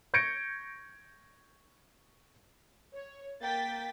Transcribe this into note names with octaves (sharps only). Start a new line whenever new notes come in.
C#6 G6 G#6 A#6 C#7 D7
C#5
A#3 G5 A6 B6